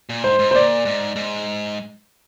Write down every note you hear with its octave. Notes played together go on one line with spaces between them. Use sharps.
A#2
G#2 C5
G#2
C5
A#2 D5
G#2
G#2